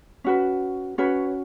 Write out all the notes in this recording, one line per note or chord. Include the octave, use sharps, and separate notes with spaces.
C#4 F#4 B4
C#4 F#4 B4 C#5